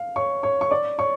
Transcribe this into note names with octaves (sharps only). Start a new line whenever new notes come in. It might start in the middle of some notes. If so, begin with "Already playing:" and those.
Already playing: F5
C#5 C#6
C#5 C#6
C#6
D5 D6
C#5 C#6